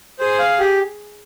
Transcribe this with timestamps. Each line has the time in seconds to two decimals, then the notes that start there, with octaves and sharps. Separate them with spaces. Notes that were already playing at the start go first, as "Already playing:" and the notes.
0.19 G#4 C5
0.39 F5
0.59 G4